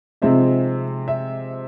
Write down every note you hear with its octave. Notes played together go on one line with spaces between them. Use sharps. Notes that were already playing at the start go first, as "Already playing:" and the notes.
C3 F3 G#3 C4 D#4 E5
E5